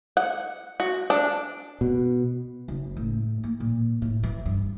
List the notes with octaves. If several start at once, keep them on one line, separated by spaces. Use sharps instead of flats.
F#5
F#4
D4
B2
F#1
A2
A#3
A#2
A2
E3
G2